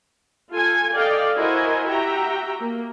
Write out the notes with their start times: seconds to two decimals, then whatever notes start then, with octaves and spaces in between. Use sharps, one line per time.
0.52 F4 A4 G#5
0.96 A4 D5 D#5 F5 G5
1.36 E4 F#4 A#4 C5 D#5 G#5
1.89 F#4 G4 E5 G5 A#5
2.60 A#3